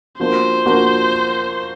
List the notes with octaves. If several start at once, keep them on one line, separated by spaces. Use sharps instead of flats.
F3 A#3 D4 F#4 C5
F3 A#3 D4 F#4